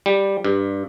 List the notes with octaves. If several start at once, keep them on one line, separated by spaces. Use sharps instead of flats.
G3
G2